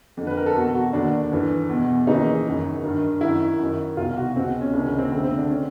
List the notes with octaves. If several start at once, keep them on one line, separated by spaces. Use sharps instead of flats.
F2 D3
B4
A#4
A4
E2 B2 F#4
F#4
D#2 D3 D4
G2 E3
E2 B2
D#2 C#3 E3 D#4
F#2 D#3
G2 D#3
D#3 E4
F#2
F#2 D#3
C2 B2 F4
F#4
C#2 B2 C4
C#4
C#2 C3 D#3 D4
C#4
C4
D2 D3 C4
C4
D4
D3 C#4